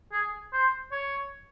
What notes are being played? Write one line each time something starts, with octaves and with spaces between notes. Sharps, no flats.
G#4
C5
C#5